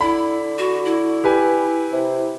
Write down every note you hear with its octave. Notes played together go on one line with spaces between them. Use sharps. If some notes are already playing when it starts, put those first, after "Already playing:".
D3 E4 B5
F#4
E4
G4 B4 G#5
C3